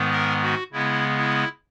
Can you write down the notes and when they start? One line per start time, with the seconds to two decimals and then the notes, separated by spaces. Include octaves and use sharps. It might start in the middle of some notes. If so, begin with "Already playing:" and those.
Already playing: G#2 D#3 G#3 B3
0.13 A#4
0.43 F#4
0.72 C#3 G#3 B3 E4
1.17 E4